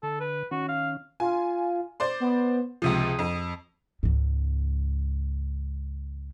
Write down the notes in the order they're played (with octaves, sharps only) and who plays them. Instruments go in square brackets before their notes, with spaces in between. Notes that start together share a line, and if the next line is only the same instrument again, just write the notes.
[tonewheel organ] D3 [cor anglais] A4
[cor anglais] B4
[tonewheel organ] D#3 C#4 [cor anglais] F#4
[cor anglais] F5
[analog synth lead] F4 [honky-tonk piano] G#5
[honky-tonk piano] C5 D5 C6
[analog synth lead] B3
[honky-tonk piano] C#2 C3 F3 [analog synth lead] D#6
[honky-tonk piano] F2
[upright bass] C#2 G#2